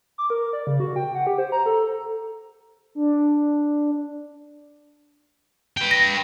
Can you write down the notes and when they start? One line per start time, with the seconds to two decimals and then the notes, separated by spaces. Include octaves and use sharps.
0.18 D6
0.30 A#4
0.53 D5
0.67 C#3
0.80 F#4
0.96 G5
1.15 F#5
1.27 G4
1.38 C5
1.52 A#5
1.66 A4
2.95 D4
5.77 B4 G5
5.91 A#6